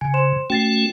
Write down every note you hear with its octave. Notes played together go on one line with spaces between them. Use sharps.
C#3 G#5
C5 C6 E7
A3 C#4 F#4 G5 A6 C7